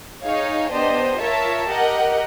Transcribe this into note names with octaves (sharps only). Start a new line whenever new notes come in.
D#4 G#4 C#5 F5
B3 D4 G4 C5 D#5
F4 A#4 C#5 E5 A5
G4 A#4 D#5 F#5